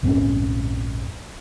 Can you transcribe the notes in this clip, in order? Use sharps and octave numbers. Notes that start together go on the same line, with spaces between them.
A#1 F2 G#2 C#4